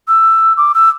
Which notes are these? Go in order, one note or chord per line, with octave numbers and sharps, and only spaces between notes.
E6
D6
E6